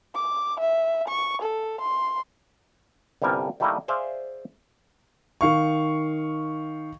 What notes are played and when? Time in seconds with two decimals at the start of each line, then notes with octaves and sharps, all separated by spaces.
0.15 D6
0.60 E5
1.08 C#6
1.42 A4
1.81 C6
3.22 G1 C2 G3 A4 A#4 G#5
3.60 D#3 G3 A3 A#3 E4 D#5
3.88 G#4 C5 D5 E5 F5
5.41 D#3 F5 C#6